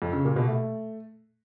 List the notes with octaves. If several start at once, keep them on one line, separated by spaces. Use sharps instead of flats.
F2
C#3
A#2
B2
A3